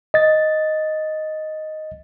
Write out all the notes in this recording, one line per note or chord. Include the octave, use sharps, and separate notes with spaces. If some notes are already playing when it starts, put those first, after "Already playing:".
D#5 A6